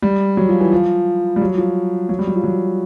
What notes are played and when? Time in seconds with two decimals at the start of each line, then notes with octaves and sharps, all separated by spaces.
0.02 G3
0.37 F#3
0.49 F3
0.60 E3
0.72 F3
1.36 G3
1.41 F#3
1.58 F3
2.09 F#3
2.19 G3
2.27 F#3
2.36 F3
2.43 F#3